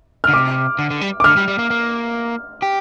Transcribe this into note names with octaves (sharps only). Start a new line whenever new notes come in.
F6
D3
C3 D6
D3
D3
G3
D6
D3 F6
G3
G3
A#3
A#3
G4